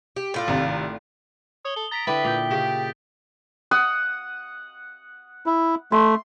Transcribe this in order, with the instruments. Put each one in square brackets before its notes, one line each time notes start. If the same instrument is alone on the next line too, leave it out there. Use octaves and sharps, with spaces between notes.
[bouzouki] G4
A2 F4 D5
[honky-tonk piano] G#1 C3
[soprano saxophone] C#5 [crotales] D#6 F#7 G7
[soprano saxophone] A4 [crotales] G7
[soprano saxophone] A#5 [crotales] A6 B6 D7
[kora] D3 E4 [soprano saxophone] B4 [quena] G5 [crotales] A6
[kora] A#2 [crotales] G6 B6
[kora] C#3 [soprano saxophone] G4
[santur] F#5 D#6
[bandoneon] E4
[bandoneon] A3 [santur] C6